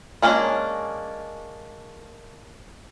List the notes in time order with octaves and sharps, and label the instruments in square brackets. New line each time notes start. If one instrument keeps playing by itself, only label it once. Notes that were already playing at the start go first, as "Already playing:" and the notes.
[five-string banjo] G#3 A#3 C#4 D4